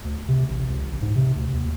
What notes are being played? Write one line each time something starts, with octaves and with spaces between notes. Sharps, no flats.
D2
C3
A1
C#2
A1
G#2
C3
D2
D#2